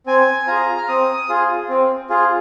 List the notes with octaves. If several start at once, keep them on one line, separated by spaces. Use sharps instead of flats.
C4 G#5
F4 G#4 A#5
F6
C4 D#6
F4 G#4
C4
F4 G#4